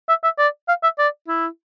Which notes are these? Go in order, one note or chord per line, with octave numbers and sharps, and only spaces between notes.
E5
E5
D5
F5
E5
D5
E4